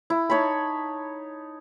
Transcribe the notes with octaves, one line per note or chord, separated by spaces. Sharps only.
E4
D#4 C#5 A5 B5